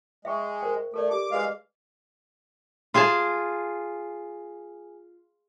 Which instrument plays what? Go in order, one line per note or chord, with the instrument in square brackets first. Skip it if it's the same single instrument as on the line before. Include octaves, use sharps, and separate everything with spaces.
[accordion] G#3 [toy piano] E5 G5 C#6
[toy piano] A#4 C5 G5
[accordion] A3 [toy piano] A4 A#4 D5
[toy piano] G4 [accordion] D6
[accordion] G#3 F5 [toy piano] G#4 B4 D#5
[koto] F4 G#4 G#5 A5